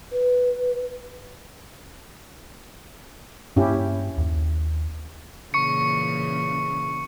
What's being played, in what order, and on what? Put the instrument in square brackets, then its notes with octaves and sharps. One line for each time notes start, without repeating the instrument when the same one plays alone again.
[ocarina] B4
[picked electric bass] G2 A#3 [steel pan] C#4 E4 G4
[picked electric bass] D#2
[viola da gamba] A#2 C#3 E3 [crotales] C#6 C#7